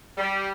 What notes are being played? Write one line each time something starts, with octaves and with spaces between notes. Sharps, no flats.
G3